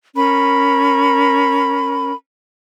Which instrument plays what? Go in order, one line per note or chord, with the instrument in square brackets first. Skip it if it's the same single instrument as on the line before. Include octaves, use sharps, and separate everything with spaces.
[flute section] C#4 A#4 B5